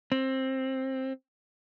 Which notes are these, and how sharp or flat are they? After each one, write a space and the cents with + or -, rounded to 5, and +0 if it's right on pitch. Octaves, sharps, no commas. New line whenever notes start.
C4 +15